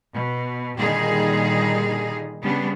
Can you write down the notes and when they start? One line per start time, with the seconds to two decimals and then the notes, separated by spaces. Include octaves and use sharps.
0.14 B2
0.77 A#2 D3 D#3 G3 D#4 G#4
2.42 C#3 G3 B3 D4